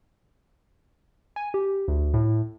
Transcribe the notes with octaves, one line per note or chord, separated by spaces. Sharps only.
G#5
G4
D2
A2